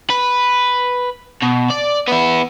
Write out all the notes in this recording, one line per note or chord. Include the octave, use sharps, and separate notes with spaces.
B4
B2
D5
B3 E4